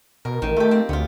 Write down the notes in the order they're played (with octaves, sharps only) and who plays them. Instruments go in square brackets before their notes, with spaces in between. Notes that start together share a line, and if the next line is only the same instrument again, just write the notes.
[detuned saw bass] B2 [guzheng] A#4
[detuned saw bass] A1 [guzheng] D#3
[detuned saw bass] A3 [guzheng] F4 G4
[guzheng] C4
[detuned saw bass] D2 [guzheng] B3 F4